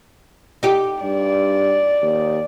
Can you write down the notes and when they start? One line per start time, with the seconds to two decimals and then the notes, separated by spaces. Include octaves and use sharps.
0.63 D#4 G4
1.03 G2 D5
2.02 D#2